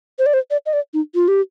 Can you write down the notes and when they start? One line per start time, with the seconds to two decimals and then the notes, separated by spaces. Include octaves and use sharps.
0.19 C5
0.26 D5
0.34 C5
0.51 D5
0.66 D#5
0.73 D5
0.94 D#4
1.15 F4
1.28 G4